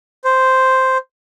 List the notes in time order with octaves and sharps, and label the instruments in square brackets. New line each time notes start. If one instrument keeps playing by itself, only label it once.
[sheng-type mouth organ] C5